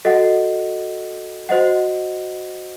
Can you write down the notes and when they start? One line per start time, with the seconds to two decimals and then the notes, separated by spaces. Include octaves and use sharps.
0.05 F#4 A4 D#5 F#5
1.49 F#4 C5 D#5 F#5